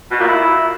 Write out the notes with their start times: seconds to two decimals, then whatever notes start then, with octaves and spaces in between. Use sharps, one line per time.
0.10 B2
0.18 A#2
0.26 E4